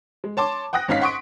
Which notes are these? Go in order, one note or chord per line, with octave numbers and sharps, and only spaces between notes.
G#3
C#5 A5 C6 D6
F#5 G5 D#6 F#6 A#6
G#1 C#4 D#4 F5 B6
F#5 C6 C#6 D#6 D7